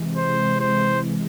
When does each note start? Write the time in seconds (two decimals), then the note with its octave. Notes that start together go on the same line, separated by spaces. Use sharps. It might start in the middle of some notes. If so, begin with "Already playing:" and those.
Already playing: C3 E3 G#3
0.17 C5
0.60 C5